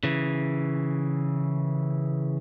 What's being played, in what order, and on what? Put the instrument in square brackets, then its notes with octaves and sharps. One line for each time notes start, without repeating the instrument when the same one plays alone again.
[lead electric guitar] C#3 E3